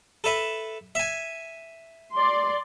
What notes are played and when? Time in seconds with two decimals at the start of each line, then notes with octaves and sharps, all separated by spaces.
0.24 A4 B4 E5
0.95 E5 G#5
2.14 D5 C6